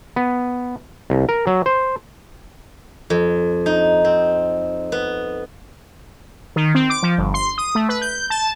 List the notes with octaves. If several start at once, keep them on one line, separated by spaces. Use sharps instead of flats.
B3
C2
A#4
F#3
C5
F2
D#4
C4
B3
D#3
C4
D6
F3
G1
C6
D#6
A3
B4
G6
A5